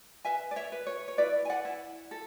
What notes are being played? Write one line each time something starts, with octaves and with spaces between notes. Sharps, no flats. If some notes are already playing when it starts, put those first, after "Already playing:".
B4 E5 G#5
D5
C#5 E5
B4
C#5
C#5
E4 B4 D5
G#5
D5 F#5
E4
A4